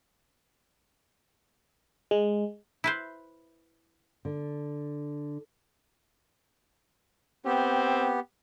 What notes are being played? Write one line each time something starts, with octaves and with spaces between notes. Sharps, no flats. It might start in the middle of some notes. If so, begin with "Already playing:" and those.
G#3
E4 B4 C5
D3
B3 C4 G4